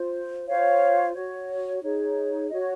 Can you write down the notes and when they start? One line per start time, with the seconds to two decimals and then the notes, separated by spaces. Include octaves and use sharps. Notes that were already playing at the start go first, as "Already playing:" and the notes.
Already playing: F4 C5
0.47 F4 C5 C#5 F5
1.15 F#4 C#5
1.83 D#4 G#4 C#5
2.51 F#4 C#5 D#5